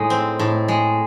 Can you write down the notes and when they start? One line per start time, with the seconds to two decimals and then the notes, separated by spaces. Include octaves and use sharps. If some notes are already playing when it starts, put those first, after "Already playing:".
Already playing: A2 G#3 D#4
0.10 C4
0.39 A2
0.68 G#3